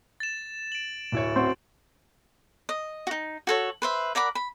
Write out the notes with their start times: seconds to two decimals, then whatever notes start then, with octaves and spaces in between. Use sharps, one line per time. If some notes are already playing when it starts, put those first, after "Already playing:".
0.20 A6 E7
0.72 D7 F#7
1.12 D1 E4 C#5
1.36 C4 F#4
2.69 D#5
3.07 D#4 F#4
3.47 F#4 A4 C#5
3.82 B4 C5 E5
4.15 A#4 D5 F#5 B5
4.35 B5